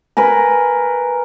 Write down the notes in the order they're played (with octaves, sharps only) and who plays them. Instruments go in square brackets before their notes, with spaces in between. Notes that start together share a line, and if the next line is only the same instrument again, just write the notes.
[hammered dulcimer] A#4 B4 G#5 A#5